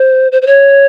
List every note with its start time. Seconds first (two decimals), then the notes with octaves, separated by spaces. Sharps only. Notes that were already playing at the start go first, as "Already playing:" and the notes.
Already playing: C5
0.32 C5
0.42 C5
0.47 C#5